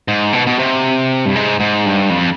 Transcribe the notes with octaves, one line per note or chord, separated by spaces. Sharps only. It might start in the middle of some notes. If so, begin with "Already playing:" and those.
G#2
B2
B2
C3
G2
G#2
G#2
G2
F2